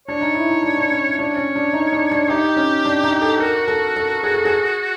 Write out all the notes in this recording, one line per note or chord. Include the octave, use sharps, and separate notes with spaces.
D4 C#5
D#4
E4
D#4
D4
D4
C#4
D4 C#5
C#4
D4
D#4
D4
D4
D#4 G4
C#4
D4
D#4
A4
F#4 A#4
A4
A4
G#4
A4
G#4